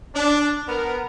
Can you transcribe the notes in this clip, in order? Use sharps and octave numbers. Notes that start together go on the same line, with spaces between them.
D4
B3 A#4